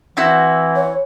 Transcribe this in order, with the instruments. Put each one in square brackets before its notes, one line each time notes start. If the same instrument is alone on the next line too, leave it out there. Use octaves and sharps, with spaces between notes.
[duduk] E3 [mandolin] C4 E4 F#4
[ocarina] C#5